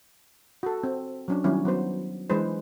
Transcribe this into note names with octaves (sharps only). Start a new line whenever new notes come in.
F#4 A4
C4
F#3 C#4 D4
D#3 F#3 G3 B3 C#4 E4
F#3 B3 C5
E3 G#3 D4 G#4 B4 C5